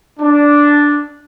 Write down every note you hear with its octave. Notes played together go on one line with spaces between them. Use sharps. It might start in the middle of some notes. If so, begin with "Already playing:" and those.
D4